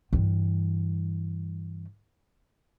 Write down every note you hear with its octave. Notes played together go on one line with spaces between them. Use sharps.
G2 E3